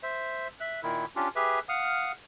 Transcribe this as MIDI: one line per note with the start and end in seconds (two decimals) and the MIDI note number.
0.03 0.48 72
0.03 0.48 76
0.60 0.80 76
0.60 0.80 90
0.83 1.05 46
0.83 1.05 51
0.83 1.05 64
1.16 1.29 61
1.16 1.29 62
1.16 1.29 65
1.16 1.29 67
1.36 1.59 67
1.36 1.59 68
1.36 1.59 71
1.36 1.59 76
1.69 2.12 77
1.69 2.12 78
1.69 2.12 87
1.69 2.12 89